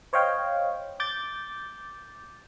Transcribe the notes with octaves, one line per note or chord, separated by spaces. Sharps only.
C5 C#5 D#5 F5 G5
D6 G6 A6